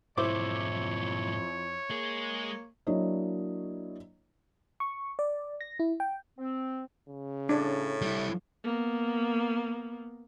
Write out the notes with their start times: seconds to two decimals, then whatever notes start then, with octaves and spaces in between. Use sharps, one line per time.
0.17 B1 F2 G#2 E4 C5 C#5 D6
1.90 G#3 A#3 G#4
2.87 F#3 A#3 D4 E4 C#5 D#5
4.80 C#6
5.19 D5
5.61 A#6
5.80 E4
6.00 G5
6.38 C4
7.09 C#3
7.49 A2 D4
8.02 G3 E4
8.64 A#3 B3